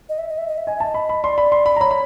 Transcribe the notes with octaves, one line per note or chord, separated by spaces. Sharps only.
D#5
E5
D#5
E5
D#5
E5
D#5 G#5
E5 A5
D#5
B5
B5
D5 C6
B5
C6
B5
A#5
C#5 B5
B5